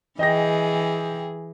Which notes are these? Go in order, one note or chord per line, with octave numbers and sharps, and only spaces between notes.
E3 G#4 D#5 G5 A#6